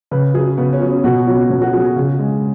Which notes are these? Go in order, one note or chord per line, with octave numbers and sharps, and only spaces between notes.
C#3 B4
F#3 G#4
C#3 B3
C#4
F#3
C#4
B2 F#4
F#3 C#4
B2 C#4
F#4
F#3 G#4
G#4
C#3 G#4
G#3